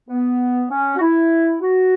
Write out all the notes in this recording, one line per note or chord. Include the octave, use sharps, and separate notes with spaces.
B3
C#4
F#4
E4
F#4